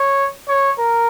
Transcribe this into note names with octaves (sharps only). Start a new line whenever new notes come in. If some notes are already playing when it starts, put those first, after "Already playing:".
Already playing: C#5
C#5
A#4